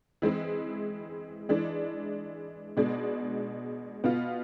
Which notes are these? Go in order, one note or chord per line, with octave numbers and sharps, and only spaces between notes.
E3 G#3 C4 E4
E3 G#3 D4
B2 G#3 D4
B2 B3 F4